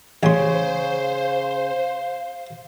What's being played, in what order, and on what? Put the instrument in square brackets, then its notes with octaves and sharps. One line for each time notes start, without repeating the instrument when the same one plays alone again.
[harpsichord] A1 C6 [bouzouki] C#3 [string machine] C5 [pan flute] F5